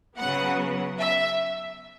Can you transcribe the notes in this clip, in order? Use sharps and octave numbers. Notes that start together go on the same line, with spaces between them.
C#3 F#3 B3 F#5
E5